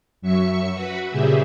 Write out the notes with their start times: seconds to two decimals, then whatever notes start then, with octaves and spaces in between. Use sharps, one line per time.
0.22 F#2 F#3 E5 C#6 C#7
0.74 F#4 B4 B5
1.10 A#2 C#3 G3 G4 G#4 E5